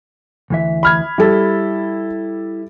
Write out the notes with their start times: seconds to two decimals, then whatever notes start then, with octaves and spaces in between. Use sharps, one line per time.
0.50 D2 E3 E5
0.83 B5 F6 G#6
1.18 G3 E4 A4